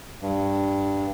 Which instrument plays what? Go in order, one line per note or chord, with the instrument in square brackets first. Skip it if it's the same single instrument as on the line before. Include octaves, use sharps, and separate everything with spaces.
[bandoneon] G2